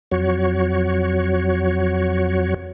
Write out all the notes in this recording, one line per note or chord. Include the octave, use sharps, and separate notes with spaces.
F2 F#3 F#4 C#5